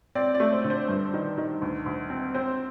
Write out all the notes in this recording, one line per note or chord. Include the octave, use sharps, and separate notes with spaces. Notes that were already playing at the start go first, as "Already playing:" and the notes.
C4 D5
D5
A3
C5
D3
C5
G2
D#3
D#3
D2
D2
C4
C4 C5